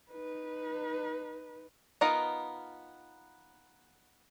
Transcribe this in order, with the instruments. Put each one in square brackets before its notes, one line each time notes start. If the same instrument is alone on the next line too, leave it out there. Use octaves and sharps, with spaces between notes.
[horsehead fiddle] D#4 B4
[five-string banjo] B3 D#4 F4 A#4 D#5